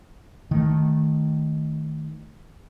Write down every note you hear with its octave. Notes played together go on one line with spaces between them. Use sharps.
D#3 A3